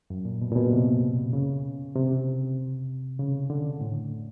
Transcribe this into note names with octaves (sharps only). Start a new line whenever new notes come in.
F#2
A#2
B2
A#2
B2
C3
C#3
C3
C#3
D3
A2